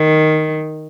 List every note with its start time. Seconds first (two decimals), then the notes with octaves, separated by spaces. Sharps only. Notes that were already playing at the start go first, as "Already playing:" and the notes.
Already playing: D#3